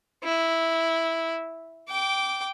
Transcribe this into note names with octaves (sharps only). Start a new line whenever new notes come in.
E4
G5 D6